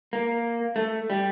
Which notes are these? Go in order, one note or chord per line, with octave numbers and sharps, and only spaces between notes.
A#3
A3
G3